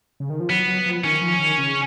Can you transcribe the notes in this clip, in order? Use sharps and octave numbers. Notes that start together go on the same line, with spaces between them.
C#3
D#3
F3
F#3 B3
F#3
F3
D#3 C#4
F3
D#3
C#3